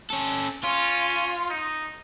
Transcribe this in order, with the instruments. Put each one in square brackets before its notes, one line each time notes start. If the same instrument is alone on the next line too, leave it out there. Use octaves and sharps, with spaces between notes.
[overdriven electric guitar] C#4 A4
[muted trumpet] C#4 [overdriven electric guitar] F4
[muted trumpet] D#4